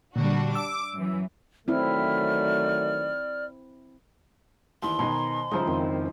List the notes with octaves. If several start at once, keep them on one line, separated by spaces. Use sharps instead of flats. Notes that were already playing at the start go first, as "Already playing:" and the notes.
A#2 D3 G3 D4 F#4
D6 E6
F#2 E3
D#3 F#3 A3 C4 E4 D5 F6
D#2 E3 C6
B2 D#3 C5 G#5 A#5
C#2 F3 G#3 D#4 E4 C5
F2 D#3 C4